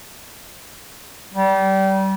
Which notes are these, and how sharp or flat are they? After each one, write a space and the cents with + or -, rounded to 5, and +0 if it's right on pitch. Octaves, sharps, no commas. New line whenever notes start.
G3 -25